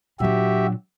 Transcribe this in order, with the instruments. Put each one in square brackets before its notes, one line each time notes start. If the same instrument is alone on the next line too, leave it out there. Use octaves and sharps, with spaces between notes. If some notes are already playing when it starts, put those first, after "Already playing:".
[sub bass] A#2 [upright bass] F#3 D4 [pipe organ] F#4 G4 E5